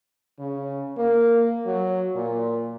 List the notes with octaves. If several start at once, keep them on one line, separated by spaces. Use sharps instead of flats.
C#3
A#3
F#3
A#2